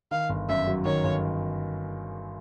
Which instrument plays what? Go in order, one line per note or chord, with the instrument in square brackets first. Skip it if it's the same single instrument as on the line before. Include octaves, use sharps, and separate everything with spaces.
[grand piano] D#3 [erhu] F5
[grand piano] G1
[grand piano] F#2 [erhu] E5
[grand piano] F#3
[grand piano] D#3 [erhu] C#5
[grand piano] G1